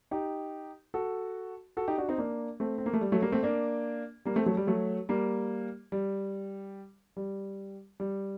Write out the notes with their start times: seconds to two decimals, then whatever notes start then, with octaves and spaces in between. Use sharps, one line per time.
0.11 D#4 G4
0.94 F#4 A4
1.77 F#4 A4
1.88 D#4 G4
1.98 D4 F#4
2.09 C4 D#4
2.18 A#3 D4
2.60 A3 C4
2.78 C4
2.86 A#3
2.93 A3
3.01 G3
3.12 F#3 A3
3.22 G3 A#3
3.32 A3 C4
3.43 A#3 D4
4.25 G3 A#3
4.36 A3 C4
4.46 F#3 A3
4.57 G3
4.67 F#3 A3
5.09 G3 A#3
5.92 G3
7.17 G3
8.00 G3